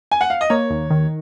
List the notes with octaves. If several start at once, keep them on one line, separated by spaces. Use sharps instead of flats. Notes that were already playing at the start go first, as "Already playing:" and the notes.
G#5
F#5
F5
D#5
A#3 C#5
D#2
D#3